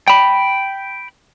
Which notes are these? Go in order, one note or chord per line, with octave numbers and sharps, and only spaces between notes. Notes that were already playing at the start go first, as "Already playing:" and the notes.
G5 B5